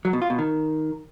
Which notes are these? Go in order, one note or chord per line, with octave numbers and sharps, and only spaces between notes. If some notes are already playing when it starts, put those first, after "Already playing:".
F#3
B2
F4
B2
D#3